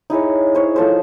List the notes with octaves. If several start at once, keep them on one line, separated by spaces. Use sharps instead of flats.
D#4 E4 G#4 C#5
C5 C#5
F3 A4 C5